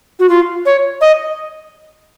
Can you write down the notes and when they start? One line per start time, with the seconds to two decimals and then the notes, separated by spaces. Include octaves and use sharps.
0.19 F#4
0.29 F4
0.66 C#5
1.01 D#5